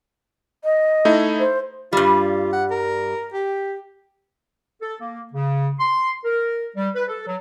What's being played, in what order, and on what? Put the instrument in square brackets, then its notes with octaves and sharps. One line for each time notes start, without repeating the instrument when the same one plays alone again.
[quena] D#5
[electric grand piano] A3 D#4 E4
[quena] C5
[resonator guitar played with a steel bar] G2 G3 [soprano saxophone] F4
[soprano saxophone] F#5
A#4
G4
[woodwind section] A4
A#3
C#3
C6
A#4
G3
B4
A4
F#3